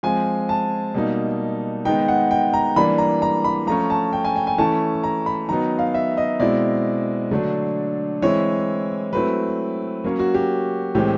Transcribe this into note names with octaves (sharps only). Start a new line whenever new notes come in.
F3 G#3 C4 G#5
A5
B2 G3 A#3 D#4
D#3 G#3 B3 D#4 G5
F#5
G5
A#5
E3 G3 A#3 D4 B5
A#5
A#5
B5
F3 A3 C#4 A#5
A5
G5
G#5
G5
G#5
E3 A3 C#4 E4 A5
A#5
B5
D#3 F#3 B3 D#4 A#5
F5
E5
D#5
B2 G#3 C4 E4 D5
D3 F#3 A3 D4
E3 G#3 C4 E4 C#5
F#3 A3 C4 E4 B4
F#3 A#3 C#4
F#4
G4
A2 E3 G#3 C4 G4